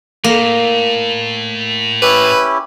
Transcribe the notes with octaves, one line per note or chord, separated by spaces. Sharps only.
A2 A#3
C#4 E4 G4 B4